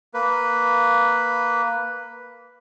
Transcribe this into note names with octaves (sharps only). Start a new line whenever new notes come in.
A#3 B4